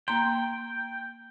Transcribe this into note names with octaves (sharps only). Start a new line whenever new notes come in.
A#3 G5 A#5 C6